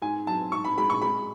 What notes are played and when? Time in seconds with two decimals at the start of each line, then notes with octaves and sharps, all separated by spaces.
0.02 G#2 G#5
0.27 F#3 A5
0.52 G#2 C#6
0.64 B5
0.78 G#3 B5
0.90 C#6
1.02 G#3 B5